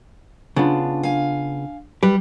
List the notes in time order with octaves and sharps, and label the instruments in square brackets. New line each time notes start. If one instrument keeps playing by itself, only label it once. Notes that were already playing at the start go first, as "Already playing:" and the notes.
[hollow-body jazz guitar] C#3 B3 F4 [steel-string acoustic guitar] D4
[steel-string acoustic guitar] F5 G#5
[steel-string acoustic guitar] G3 [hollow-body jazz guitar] G4 B4